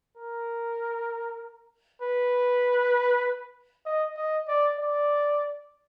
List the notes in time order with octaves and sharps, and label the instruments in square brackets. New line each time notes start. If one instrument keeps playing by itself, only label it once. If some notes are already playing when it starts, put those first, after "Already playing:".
[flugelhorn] A#4
B4
D#5
D#5
D5
D5